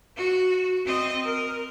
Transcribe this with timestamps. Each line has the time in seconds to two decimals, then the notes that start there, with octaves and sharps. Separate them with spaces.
0.17 F#4
0.85 C4 D#5
1.25 A#4